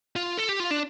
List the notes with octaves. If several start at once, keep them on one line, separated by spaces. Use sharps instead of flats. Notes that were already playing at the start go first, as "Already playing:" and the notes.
F4
A4
G4
F4
D4